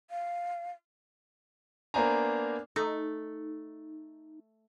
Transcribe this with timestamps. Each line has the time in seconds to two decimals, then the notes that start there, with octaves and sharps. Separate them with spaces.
0.10 F5
1.94 A#3 B3 D4 C5 G#5 A#5
2.76 A3 D#4